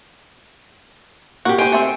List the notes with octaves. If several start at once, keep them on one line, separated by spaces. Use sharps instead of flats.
A#3 F#4 G4
G#3 C5 G5 G#5
A3 C4